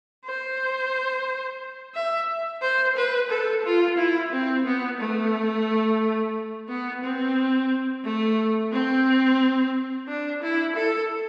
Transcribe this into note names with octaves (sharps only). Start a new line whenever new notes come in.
C5
E5
C5
B4
A4
F4
E4
C4
B3
A3
B3
C4
A3
C4
D4
E4
A4